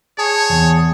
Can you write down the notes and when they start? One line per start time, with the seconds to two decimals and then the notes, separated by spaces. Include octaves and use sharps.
0.18 G#4 C#5 A5
0.49 E2